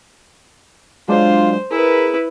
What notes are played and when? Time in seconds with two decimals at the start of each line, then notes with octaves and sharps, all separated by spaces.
1.08 F#3 G#3 D4 F4 C5
1.71 E4 G#4 A#4 B4